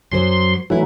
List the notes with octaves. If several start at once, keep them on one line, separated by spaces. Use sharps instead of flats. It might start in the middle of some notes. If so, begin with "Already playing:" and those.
F#2 F#3 C5 C6
E3 F#3 A3 D4 E4